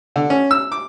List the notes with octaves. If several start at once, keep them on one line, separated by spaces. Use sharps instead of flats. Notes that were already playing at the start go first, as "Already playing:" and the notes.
D3
C#4
E6
D6